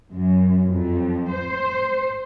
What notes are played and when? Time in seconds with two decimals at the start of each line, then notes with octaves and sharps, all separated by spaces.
0.13 F#2
0.69 F2
1.31 C5